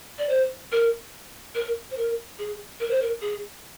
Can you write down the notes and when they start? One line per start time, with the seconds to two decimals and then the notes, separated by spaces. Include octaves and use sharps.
0.18 D5
0.29 C5
0.72 A#4
1.55 A#4
1.91 C5
1.97 A#4
2.39 G#4
2.80 A#4
2.90 C5
3.02 A#4
3.21 G#4